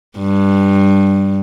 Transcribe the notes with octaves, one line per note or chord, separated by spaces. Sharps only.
G2